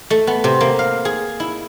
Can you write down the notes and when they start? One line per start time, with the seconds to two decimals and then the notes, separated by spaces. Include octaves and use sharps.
0.10 A3
0.27 B3
0.44 C3
0.61 A#3
0.79 F5
1.05 G#4
1.40 E4